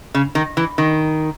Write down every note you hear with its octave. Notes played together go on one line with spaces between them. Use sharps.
C#3
D#3
E3
D#3